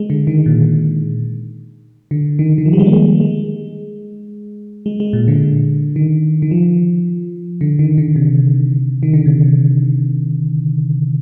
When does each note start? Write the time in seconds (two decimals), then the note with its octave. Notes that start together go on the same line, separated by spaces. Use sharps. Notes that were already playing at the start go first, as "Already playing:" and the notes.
Already playing: G#3
0.10 D3
0.27 D#3
0.46 A#2
2.11 D3
2.39 D#3
2.58 D#3
2.66 F3
2.73 G3
2.79 G#3
2.86 A#3
2.93 G#3
3.21 G#3
4.86 G#3
5.00 G#3
5.13 A#2
5.28 D3
5.96 D#3
6.42 D#3
6.51 F3
7.61 D3
7.79 D#3
7.98 D3
8.16 C3
9.03 D#3
9.13 D3
9.26 C3